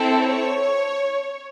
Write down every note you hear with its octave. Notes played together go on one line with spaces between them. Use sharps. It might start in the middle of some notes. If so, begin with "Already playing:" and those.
Already playing: C4 E4 A4
C#5